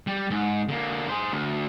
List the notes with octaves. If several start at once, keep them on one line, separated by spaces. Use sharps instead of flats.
G3
G#2
D3 A#3
G#4 C5
D2